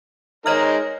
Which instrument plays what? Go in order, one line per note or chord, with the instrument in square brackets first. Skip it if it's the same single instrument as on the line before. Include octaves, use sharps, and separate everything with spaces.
[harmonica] G#3 D#4 A#4 [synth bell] C#5 D#5 F6